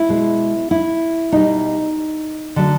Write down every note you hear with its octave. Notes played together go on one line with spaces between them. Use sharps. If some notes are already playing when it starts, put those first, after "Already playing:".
Already playing: E4
B2 G#3
E4
B2 G3 D#4
D3 F#3 A3